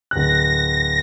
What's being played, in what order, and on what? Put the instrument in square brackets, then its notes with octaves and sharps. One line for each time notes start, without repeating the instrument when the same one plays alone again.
[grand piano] D1 F#6 [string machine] A#6